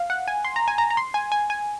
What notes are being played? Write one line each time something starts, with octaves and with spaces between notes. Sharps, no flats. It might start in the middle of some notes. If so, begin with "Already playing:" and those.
Already playing: F5
F#5
G#5
C6
A#5
G#5
A#5
A#5
C6
G#5
G#5
G#5